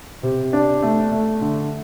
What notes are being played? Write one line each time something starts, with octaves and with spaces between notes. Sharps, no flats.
C3
D4
A3
A3
D3